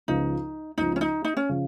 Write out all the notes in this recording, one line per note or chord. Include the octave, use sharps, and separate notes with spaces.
C#2 C#3 F3 D#4
C#2 C#3 F3 D#4
C#4
D#4
D#4
C#4
C#3 F3